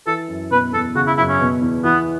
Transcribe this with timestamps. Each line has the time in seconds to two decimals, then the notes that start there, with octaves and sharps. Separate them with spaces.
0.07 E3 A4
0.28 F#2
0.51 B2 B4
0.73 E2 A4
0.95 C#3 F#4
1.07 E4
1.17 F#2 E4
1.29 C#4
1.40 B2
1.61 E2
1.84 E3 B3